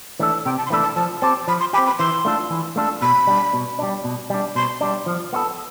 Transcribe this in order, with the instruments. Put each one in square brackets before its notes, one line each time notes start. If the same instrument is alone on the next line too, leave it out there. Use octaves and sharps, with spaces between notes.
[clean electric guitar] E3 A3 D4 A4
[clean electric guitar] C3 [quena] G5
[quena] A5
C6
[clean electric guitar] E3 A3 D4 A4 [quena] B5
[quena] A5
[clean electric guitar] F3 [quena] A5
[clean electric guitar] C4 G4 [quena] A5
[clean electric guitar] F3 [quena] B5
[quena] C6
[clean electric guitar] G4 [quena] B5
[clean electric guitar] C4
[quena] B5
[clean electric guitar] E3 [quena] C6
[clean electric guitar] A3 D4 F4 A4
E3
A3 D4 F4 A4
[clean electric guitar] B2 [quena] B5
[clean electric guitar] G3 D4
B2
G3 D4
B2
G3 D4
[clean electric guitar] B2 [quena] C6
[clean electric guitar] G3 D4
F3
B3 F4 A4